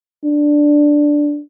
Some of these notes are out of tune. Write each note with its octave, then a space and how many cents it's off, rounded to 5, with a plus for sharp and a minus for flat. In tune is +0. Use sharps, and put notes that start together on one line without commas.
D4 +0